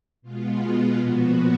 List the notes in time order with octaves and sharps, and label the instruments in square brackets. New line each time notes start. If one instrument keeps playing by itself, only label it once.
[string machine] B2 G#3 B3 F4
F4
A#2 F3 B3 F#4